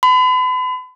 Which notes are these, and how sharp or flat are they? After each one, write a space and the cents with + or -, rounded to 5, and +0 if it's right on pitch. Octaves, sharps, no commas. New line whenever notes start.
B5 +40